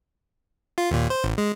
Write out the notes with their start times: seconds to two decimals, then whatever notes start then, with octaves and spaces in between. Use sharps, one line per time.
0.78 F4
0.91 D#2 A#2
1.10 C5
1.24 A1
1.38 G#3